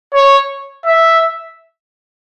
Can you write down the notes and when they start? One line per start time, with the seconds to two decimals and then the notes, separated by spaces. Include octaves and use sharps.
0.14 C#5
0.86 E5